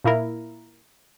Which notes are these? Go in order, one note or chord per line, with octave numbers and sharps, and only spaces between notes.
A#2 A#3 E4 A#4